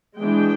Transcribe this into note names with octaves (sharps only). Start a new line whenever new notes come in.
E3 G#3 B3 D4 G5